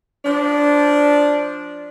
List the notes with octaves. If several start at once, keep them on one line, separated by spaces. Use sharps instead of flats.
F3 D4